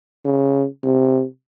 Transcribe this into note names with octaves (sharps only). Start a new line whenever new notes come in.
C#3
C3